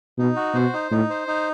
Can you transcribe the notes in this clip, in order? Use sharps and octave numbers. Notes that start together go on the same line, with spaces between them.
B2 D#4
F#4
B2 C5
D#4
A2 D#4
C5
D#4